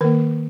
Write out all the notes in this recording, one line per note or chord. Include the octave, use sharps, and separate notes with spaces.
D#3 A#3 A#4